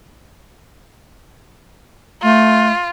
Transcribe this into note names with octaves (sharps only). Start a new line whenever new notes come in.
A3 F4